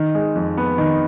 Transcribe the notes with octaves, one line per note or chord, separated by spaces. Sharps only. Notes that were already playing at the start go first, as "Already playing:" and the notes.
Already playing: D#3
G#3
F2
B3
D#3